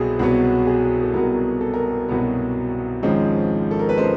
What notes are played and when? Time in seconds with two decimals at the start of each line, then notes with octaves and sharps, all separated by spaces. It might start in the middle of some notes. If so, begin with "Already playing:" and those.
Already playing: C2 B2 F#3 B3 G#4 A4
0.19 C2 B2 F#3 B3 F#4
0.67 G#4
1.03 A4
1.14 C2 B2 F#3 B3 A#4
1.61 A4
1.74 A#4
1.88 A4
2.09 C2 B2 F#3 B3
3.03 G#1 G#2 F3 G#3 C#4
3.71 A4
3.79 A#4
3.89 B4
3.97 F3 G#3 C#4 C5